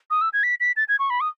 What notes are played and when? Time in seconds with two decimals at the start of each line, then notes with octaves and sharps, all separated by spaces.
0.10 D#6
0.21 E6
0.33 G#6
0.43 B6
0.60 B6
0.77 A6
0.88 G#6
0.99 C#6
1.10 B5
1.21 D#6